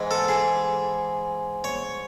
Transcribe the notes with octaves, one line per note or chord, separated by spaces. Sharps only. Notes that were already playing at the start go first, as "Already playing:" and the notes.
Already playing: G#2 E3 G#3
A4
G#4
C#5